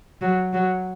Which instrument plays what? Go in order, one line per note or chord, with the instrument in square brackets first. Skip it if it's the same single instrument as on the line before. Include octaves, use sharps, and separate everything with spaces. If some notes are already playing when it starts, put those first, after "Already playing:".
[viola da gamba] F#3
F#3